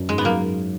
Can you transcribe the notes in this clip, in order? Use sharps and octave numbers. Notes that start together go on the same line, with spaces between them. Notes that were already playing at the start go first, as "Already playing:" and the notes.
Already playing: F#2
G#2 G#3
B3
F#3 A#3